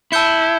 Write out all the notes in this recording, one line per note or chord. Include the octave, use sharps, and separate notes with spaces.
E4 A5 E6 G6 C#7 G7